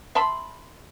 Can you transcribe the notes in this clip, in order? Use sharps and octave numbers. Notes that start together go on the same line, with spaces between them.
E5 A5 B5 C6